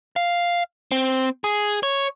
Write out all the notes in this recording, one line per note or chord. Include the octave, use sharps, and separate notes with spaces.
F5
C4
G#4
C#5